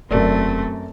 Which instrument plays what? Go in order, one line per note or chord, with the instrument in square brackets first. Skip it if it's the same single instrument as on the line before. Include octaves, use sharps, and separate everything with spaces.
[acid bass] E1 [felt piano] F#2 A#4 D5 [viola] A3 C4